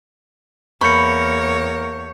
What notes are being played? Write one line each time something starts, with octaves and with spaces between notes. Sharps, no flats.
E2 A#3 A#4 C#5 B5 C#6 G6 C#7